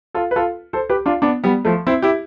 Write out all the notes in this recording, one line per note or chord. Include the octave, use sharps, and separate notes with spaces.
F4 A4
B4
F4 A4
A4 C5
G4 B4
D4 F4
B3 D4
G3 B3
F3 A3
C4 E4
E4 G4